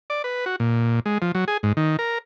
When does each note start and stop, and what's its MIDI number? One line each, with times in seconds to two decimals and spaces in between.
0.10 0.22 74
0.24 0.45 71
0.46 0.56 66
0.60 1.00 46
1.06 1.18 56
1.22 1.32 53
1.35 1.45 54
1.48 1.57 68
1.63 1.72 44
1.77 1.97 51
1.99 2.18 70